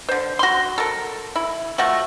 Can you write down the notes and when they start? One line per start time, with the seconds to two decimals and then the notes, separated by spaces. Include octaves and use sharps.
0.09 D3 C5
0.39 F#4 C6
0.78 A4 A#4
1.36 E4
1.78 F3 A3 F#4 F#5